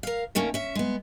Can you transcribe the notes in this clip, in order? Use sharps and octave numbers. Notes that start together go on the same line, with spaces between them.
A#4 F5
D#3 A3 A#3 C#4
C#4 E5
G#3 B3